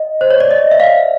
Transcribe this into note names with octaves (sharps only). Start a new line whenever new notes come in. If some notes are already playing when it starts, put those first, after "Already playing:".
Already playing: D#5
C5
C#5
D5
D#5
E5
F5